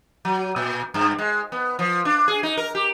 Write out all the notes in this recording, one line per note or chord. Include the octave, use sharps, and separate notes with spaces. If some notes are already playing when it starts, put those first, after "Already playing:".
F#3
A#2
G2
G#3
B3
F3
D4
G#4
D#4
A#4
G4